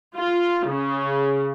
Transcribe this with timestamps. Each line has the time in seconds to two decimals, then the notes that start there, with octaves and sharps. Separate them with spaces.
0.17 F4
0.67 C#3